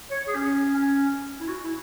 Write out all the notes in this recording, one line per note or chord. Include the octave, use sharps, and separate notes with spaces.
C#5
G#4
C#4
C#4
E4
F#4
E4